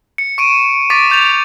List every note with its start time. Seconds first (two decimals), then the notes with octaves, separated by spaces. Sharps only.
0.18 C#7
0.38 C#6 D7 D#7
0.90 C#6 D6 A6 B6 D7
1.10 D6 G6 A6 F7